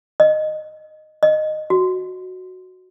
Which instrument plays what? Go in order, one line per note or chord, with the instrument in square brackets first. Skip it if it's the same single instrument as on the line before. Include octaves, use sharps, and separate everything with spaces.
[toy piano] D#5
D#5
F#4